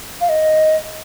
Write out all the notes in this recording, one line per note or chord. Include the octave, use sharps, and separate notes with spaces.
F5
D#5